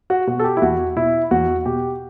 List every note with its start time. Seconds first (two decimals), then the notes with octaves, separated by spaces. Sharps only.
0.10 F#4
0.27 B2 F#4
0.39 A4
0.44 G4
0.57 E4
0.62 E2 F#4
0.96 B2 E4
1.31 E2 F#4
1.66 B2 G4